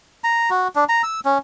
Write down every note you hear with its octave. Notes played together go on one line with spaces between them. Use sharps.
A#5
F#4
D4
A#5
E6
C#4